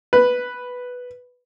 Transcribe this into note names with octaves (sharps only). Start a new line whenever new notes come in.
B4